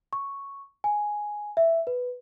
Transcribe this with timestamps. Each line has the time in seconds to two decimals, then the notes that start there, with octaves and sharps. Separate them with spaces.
0.13 C#6
0.84 G#5
1.57 E5
1.87 B4